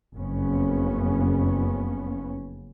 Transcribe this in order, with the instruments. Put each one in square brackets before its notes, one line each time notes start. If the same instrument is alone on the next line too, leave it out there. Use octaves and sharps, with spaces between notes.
[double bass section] F#1 F2 B3 C#4